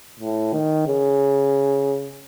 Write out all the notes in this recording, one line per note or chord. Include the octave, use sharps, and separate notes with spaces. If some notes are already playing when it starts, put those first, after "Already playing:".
A2
D#3
C#3